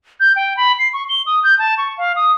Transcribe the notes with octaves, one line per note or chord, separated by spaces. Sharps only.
G6
G5
B5
C7
C#6
G7
D#6
G6
A5
C#6
F5
D#6